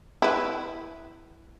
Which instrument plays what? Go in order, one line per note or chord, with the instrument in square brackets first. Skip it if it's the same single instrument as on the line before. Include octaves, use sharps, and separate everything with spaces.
[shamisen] E4 B4